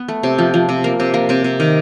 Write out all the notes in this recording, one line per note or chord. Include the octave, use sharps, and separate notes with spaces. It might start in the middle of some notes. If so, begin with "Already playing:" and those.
Already playing: B3
A3
C3
F3
F3
C3
A#3
C3
A#3
C3 C4
C3
D#3